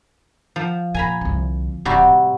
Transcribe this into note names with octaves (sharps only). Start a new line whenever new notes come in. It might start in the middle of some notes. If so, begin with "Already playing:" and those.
F3
A#2 G#5 A#5 B5
C2 D3
D1 C3 E3 G3 F#4
A2